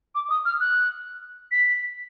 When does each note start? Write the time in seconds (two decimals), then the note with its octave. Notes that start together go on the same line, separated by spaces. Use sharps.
0.15 D6
0.30 D#6
0.45 F6
0.60 F#6
1.52 B6